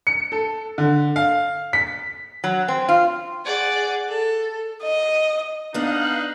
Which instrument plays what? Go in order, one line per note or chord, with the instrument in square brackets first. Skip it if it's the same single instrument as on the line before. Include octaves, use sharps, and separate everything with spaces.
[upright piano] C#7
A4
D3
F5
B6
[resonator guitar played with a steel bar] F#3
C4
F4
[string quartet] G#4 D5 F#5
A4
[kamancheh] D#5
[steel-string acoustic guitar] B3 D4 [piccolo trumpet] D#4 [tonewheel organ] F5 F#6